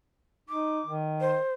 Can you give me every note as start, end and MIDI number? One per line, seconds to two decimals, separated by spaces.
0.49 0.80 63
0.49 0.92 86
0.86 1.35 51
1.21 1.54 72